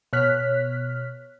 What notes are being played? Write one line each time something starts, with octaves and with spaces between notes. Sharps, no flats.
B2 C#5 F6 F#6 B6